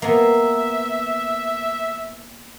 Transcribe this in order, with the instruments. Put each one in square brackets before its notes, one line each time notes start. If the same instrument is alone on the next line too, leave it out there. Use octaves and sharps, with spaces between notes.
[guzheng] A#3 B3 [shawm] E5